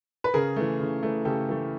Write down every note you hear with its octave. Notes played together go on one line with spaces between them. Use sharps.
B4
C#3 G#4 A#4
E3 A3
C#3
E3 A3
C#3 G4 A4
E3 A3